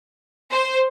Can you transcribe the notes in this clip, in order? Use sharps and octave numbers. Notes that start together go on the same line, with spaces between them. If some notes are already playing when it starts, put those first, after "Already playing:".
C5